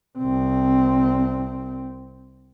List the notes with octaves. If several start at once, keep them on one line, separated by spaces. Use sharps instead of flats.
C2 C4